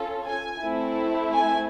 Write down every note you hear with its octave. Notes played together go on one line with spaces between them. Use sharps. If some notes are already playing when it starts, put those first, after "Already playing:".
Already playing: C#4 F4 A4
G#5
A3 C4 E4
G#5